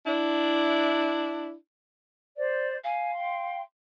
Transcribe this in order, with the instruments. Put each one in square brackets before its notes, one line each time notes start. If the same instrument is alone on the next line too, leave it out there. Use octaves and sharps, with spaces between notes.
[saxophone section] D4 E4
[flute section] C5 D5
[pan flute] F5 [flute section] G#5
[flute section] G5 C6